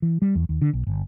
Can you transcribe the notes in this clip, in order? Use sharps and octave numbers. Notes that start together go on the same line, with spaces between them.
E3
G3
E2
D#2
D3
B1
G1